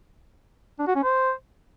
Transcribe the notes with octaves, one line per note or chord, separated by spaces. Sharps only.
D4
F#4
C#4
C5